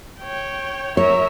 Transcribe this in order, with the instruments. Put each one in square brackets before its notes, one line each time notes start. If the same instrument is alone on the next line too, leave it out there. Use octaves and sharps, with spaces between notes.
[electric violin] C#5 G5
[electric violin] A#4 E5 [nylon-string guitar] C#5